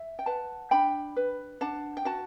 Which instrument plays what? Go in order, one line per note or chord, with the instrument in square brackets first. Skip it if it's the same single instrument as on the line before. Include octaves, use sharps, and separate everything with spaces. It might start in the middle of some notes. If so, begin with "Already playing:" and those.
Already playing: [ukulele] E5
G5
B4 F#5 A5
D4 G5 B5
B4
D4 F#5 A5
G5
F#4 F#5 A5